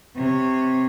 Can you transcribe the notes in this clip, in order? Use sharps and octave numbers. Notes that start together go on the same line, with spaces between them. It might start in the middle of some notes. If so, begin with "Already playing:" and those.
C3 C#5